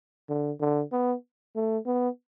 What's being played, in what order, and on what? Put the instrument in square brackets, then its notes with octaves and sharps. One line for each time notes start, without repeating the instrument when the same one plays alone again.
[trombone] D3
D3
B3
A3
B3